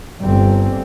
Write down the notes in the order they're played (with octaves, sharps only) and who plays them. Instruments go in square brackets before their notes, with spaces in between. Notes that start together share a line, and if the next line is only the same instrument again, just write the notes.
[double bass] G1 C4